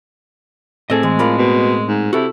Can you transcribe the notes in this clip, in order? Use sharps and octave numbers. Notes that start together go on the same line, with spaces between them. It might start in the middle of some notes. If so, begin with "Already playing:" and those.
A2 C4 G#4 A4 D#5
E3 G#3
F3 A#4 D5 B5
B2
G#2
C3 E4 F#4 A4